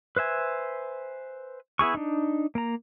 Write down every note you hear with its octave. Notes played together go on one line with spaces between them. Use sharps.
B4 C5 E5 G#5
B3 E4 G#4 C#6
D4 D#4
A#3 A#5